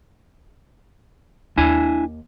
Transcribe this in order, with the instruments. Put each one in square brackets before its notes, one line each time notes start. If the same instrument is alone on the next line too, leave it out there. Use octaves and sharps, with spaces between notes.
[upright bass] D#2 [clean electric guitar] D4 E4 G#5